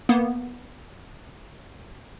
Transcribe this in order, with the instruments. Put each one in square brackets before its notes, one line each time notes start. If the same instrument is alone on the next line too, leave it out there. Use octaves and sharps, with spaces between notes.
[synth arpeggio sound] A#3 B3